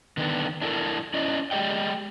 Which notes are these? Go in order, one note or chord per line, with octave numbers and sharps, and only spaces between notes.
D3 D#3 B3 D4
D4 E4 F#4 A4 A#4
C#4 E4 D5 D#5
G#3 G4 D5 D#5 G5